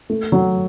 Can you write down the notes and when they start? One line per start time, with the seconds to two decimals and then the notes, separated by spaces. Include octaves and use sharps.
0.10 A3
0.32 F#3